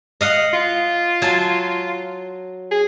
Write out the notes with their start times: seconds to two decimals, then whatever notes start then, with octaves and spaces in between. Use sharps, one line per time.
0.21 D#5 F5 F#5
0.54 F4
1.22 F#3 G#5 A5
2.71 G#4